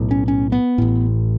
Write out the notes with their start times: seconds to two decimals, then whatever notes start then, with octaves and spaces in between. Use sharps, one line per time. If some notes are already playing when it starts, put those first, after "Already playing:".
Already playing: B1 A2
0.11 C#4
0.28 C#4
0.52 B3
0.78 A1 A2